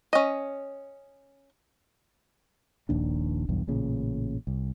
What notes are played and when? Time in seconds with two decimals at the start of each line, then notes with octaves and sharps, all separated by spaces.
0.13 C#4 D#5
2.89 D#1 A#1 D#2 D4
3.49 B1 E2 G2
3.67 A1 A#2 C#3
4.47 C2